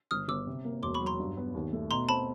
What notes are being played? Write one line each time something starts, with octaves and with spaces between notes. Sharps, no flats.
G1 D#6 F6
G1 D6 E6
C3
A#3
E1 C6 D6
B5 C#6
F#3
A#5 C6
G2
B3
D#2
A3
B2 A#5 C6
C4 A5 B5